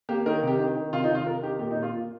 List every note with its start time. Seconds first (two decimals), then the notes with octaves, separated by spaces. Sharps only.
0.09 A#3 G4
0.26 D#3 A#4
0.42 C3
0.47 G4
0.59 D#3
0.75 D#3
0.93 C3 F4
1.04 D#4
1.10 C3 F4
1.26 C3 A#4
1.42 D#3 G4
1.59 A#2 G4
1.71 D#4
1.76 A#2
1.83 F4
1.94 A#2